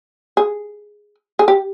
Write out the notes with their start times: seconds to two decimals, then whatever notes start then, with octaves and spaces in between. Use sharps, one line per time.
0.37 G#4
1.39 G#4
1.48 G4